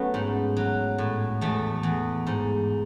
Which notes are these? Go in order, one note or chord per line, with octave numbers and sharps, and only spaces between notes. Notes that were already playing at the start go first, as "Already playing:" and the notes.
Already playing: F#3 A3 B3 C#4
G#2
F#3
A2
E2 A3
E2
G#2